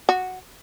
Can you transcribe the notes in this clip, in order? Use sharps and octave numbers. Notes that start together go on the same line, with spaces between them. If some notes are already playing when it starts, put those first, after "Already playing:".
F#4